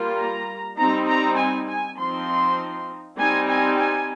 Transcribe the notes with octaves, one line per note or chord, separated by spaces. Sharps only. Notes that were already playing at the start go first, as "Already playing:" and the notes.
Already playing: G3 A#3 F4
A#5
G3 C4 D#4 A#5
A#5
G#5
G#5
F3 C4 D#4 C6
G3 C4 D#4 G#5
G#5
G#5